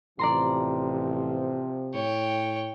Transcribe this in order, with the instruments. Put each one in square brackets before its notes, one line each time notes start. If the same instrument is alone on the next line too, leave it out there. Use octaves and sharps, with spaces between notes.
[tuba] A1 [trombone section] C3 F3 [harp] D5 A#5 C6
[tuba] A2 [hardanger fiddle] C#5 G5